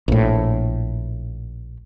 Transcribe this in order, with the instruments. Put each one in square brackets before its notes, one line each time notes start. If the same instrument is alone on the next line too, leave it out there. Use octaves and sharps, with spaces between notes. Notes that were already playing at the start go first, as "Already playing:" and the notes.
[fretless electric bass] A#1 A2